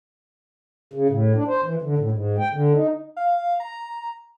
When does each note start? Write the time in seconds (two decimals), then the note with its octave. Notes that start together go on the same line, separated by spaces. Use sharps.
0.93 C#3
1.10 A2
1.35 D4
1.48 C5
1.64 E3
1.82 D3
1.98 A2
2.11 G#2
2.38 G5
2.53 D3
2.75 D#4
3.17 F5
3.60 A#5